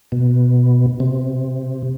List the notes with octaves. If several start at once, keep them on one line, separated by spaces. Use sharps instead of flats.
B2
C3